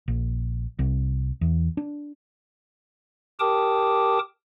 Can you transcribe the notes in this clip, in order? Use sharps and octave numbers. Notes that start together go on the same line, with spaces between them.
A#1
C2
E2
D4
G4 A#4 G5 A5 D6 D#6